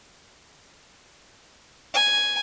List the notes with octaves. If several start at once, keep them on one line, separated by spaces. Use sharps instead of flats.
G#5